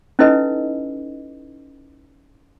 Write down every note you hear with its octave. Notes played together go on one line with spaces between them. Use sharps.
C#4 D#4 E4 A4 B4 D#5